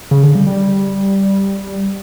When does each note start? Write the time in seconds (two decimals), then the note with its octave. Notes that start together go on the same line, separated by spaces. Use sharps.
0.11 C#3
0.23 D3
0.35 G3
0.47 G3